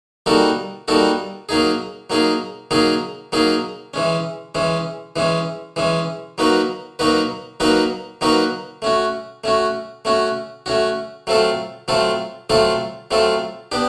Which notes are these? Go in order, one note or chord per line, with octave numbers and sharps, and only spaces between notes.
G3 A#3 D#4 F#4 A4
G3 A#3 D#4 F#4 A4
F#3 A#3 D#4 G#4
F#3 A#3 D#4 G#4
F#3 A#3 D#4 G#4
F#3 A#3 D#4 G#4
E3 G#3 C#4
E3 G#3 C#4
E3 G#3 C#4
E3 G#3 C#4
F#3 A#3 D#4 F#4 B4
F#3 A#3 D#4 F#4 B4
F#3 A#3 D#4 F#4 B4
F#3 A#3 D#4 F#4 B4
A3 C#4 F#4
A3 C#4 F#4
A3 C#4 F#4
A3 C#4 F#4
F#3 A3 C4 F4 A4
F#3 A3 C4 F4 A4
F#3 A3 C4 F4 A4
F#3 A3 C4 F4 A4
B3 D4 G4